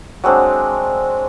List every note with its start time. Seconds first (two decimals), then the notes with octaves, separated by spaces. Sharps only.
0.24 F#3 G#3 C4 D4